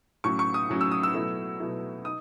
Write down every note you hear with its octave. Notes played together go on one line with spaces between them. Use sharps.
A2 F#3 C#4 C#6
C#6
D#6
A2 F#3 C#4
E6
D#6
E6
B2 F#3 A3 E4
B2 F#3 A3 E4
D#4 D#6